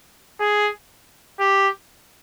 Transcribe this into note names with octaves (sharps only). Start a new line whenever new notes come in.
G#4
G4